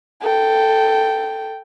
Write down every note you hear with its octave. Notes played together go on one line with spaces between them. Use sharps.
A4 G5